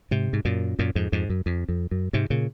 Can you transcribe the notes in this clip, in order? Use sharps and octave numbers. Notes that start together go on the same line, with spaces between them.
G#2 C3
G#2
F#2 A#2
F#2 A#2
F2 G#2
F2 G#2
F#2
F2
F2
F#2
G#2 C3
A#2 C#3